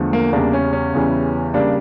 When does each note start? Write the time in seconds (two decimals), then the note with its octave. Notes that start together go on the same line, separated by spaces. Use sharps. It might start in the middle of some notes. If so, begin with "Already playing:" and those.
Already playing: E2 D3 F3 A3
0.13 A#3
0.33 E2 C#3 G3 A#3 D4
0.53 C#4
0.73 C#4
0.94 E2 C#3 E3 G3
1.54 C#3 G3 A#3 D4